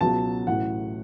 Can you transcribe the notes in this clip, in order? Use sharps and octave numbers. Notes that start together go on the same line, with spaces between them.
C#2 B2 F#3 A5
A1 A2 F#3 F#5